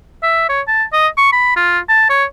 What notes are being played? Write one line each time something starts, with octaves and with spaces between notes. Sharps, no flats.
E5
C#5
A5
D#5
C#6
B5
F4
A5
C#5